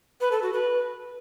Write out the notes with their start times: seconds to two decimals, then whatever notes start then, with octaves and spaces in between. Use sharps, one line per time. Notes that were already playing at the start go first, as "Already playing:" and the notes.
0.21 B4
0.32 A4
0.42 F#4
0.53 B4